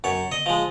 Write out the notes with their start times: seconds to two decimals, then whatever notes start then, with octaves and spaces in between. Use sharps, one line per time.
0.04 F#2 C#5
0.32 D#5
0.46 F3 G#3